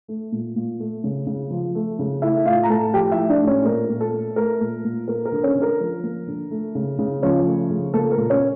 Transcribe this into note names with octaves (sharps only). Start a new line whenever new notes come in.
A3
A#2
A#2
A3
C#3
C#3
F3
A3
C#3
A3 E4 E5
A2 F4 F5
A#5
A2 A4 A5
F3 G4 G5
E4 E5
A3
D4 D5
A2
C#4 C#5
A#2 A#4
A#2
A4
A3
A3 A#4
A#2
A#2
A#3 A#4
A#4
D3
C#4 C#5
D3
A#4
F3
A#3
D3
A3
C#3
C#3
F3 C#4 C#5
A3
C#3
A#3 A4
A#4
A#2
C#4 C#5